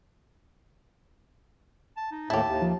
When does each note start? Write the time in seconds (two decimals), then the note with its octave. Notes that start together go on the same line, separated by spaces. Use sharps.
1.97 A5
2.11 D#4
2.30 D#2 A2 E4 G4 A5
2.47 D#2
2.62 F3